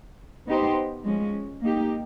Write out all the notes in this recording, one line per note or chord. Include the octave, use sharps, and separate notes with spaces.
B3 D#4 G4 C5
F3 G#3 C#4
A#3 D#4 G4